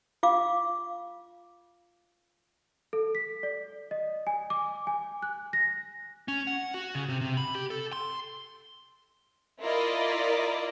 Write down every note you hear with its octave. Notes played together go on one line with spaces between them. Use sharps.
F4 F5 D6
A4
B6
D5
D#5
G#5
D6
G#5
F#6
A#6
C#4
F#5
F#4
C#3
C3
C3
B5
G4
A4
C6
E4 F4 A#4 D5 D#5